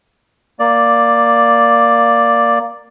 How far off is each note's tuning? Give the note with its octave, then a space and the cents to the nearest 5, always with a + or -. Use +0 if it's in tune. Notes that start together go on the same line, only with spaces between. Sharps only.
A#3 +0 D5 +0